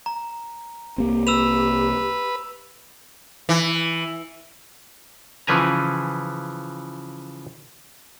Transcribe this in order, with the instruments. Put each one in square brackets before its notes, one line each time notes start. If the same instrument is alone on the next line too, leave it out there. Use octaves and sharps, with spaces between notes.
[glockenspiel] A#5
[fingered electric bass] C2 A#3 C4 [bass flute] G4
[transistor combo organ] B4 [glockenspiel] E6 E7 F7
[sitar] E3
[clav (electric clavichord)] C#3 E3 F3 B4 G#5 A#5